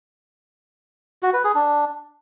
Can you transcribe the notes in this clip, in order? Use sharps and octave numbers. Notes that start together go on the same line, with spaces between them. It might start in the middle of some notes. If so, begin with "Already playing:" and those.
F#4
B4
G#4
D4